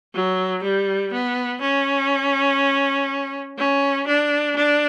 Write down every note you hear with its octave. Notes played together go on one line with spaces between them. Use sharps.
F#3
G3
B3
C#4
C#4
D4
D4